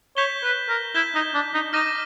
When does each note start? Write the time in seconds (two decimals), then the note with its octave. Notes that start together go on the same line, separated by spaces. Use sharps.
0.17 C#5 G6 B6 E7 G7
0.44 B4
0.69 A#4
0.94 E4 G6 B6 E7 G7
1.15 D#4
1.34 D4
1.54 D#4
1.73 D#4 D6 F6 A#6 D#7